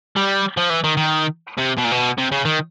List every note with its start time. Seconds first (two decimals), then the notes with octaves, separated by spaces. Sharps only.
0.16 G3
0.57 F3
0.70 E3
0.84 D#3
0.97 D#3
1.58 C3
1.78 B2
1.84 A#2
1.92 B2
2.18 C3
2.32 C#3
2.45 D#3